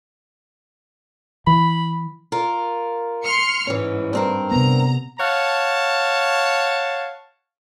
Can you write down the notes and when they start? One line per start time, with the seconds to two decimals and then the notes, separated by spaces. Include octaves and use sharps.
1.47 E3 B5
2.32 F4 A#4
3.24 C6 F6 C#7
3.67 G#2 E3 C#4
4.13 G2 C4 A#4
4.52 C3 B3 A#5
5.19 C#5 F5 F#5 A5